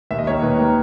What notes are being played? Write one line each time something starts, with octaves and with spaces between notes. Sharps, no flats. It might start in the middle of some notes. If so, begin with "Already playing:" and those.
D#2 E5
D#5
D#3 A#3 C#5
D#2 B4
D#3 A#3 A#4